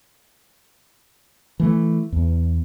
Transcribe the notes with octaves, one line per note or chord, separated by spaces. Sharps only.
E3 A3
E2